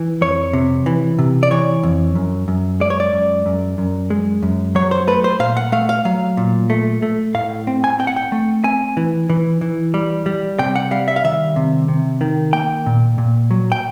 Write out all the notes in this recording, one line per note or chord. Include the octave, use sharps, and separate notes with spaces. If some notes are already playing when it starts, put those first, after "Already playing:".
Already playing: E3
F2 C#5
C3
E3
C3
D5
E3 C#5
F2
F#2
F#2
G#3 D5
C#5
D5
F#2
F#2
F#2
G#3
F#2
F#3 C#5
C5
A3 B4
C5
A#2 F5
F#5
A3 F5
F5
F#3 F5
A#2
A3
A3
A2 F5
C4
G#5
C4 G5
F#5
G5
A3
C4 G#5
E3
E3
E3
G3
G3
C3 G5
F#5
G3 F5
E5
F5
D#3 E5
C3
C3
D#3
A#3 G5
A#2
A#2
F#3
G5